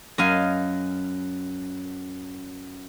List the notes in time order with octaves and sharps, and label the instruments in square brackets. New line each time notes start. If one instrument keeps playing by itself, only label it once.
[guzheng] F#2 D#5 F5 G#5